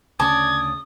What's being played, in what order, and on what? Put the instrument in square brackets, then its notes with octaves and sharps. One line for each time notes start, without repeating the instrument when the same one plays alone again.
[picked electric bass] D2 C#3 C#4 [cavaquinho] D5 A5 D6 [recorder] D#6 [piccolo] G#6